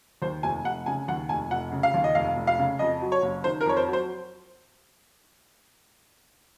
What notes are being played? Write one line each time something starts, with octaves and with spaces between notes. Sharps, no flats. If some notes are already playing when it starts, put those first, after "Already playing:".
D#2 C5
F1 G#5
F1 F#5
C#3 G#5
D#2 F#5
F1 G#5
F1 F#5
C#3
F5
D#2
D#5
F1 F5
F1
F5
C#3
F2 D#5
F#3
C#5
F#1
D#3 C5
A#4
F2 C#5
C5
F#3
C5